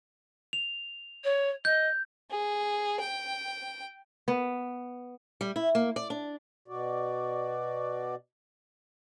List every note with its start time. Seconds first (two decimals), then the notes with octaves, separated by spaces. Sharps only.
0.53 F7
1.24 C#5
1.65 D#5 G6
2.31 G#4
3.00 G5
4.28 B3
5.41 G3
5.56 E4
5.75 A#3
5.96 D5
6.10 D4
6.68 B2 F#4 D5